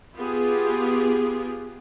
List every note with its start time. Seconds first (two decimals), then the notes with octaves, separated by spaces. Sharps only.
0.15 B3 F4 G4 G#4